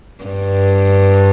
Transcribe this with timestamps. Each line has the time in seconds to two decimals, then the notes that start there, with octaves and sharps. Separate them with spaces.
0.24 G2